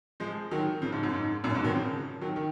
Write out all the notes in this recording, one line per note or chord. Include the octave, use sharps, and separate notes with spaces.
F3 G#3
D#3 F#3
C#3 F3
G#2
F#2
G#2
F#2 A#2
G#2 B2
D#3 F#3
C#3 F3
D#3 F#3
D#3